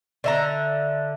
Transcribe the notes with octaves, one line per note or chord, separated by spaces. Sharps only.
D3 E5 A#5